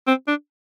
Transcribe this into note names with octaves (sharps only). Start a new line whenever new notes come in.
C4
D4